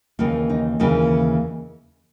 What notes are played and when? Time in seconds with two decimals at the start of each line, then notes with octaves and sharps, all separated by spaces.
0.19 D#2 C#3 E3 A#3 D#4
0.50 D#4
0.79 D#2 C#3 E3 A#3 D#4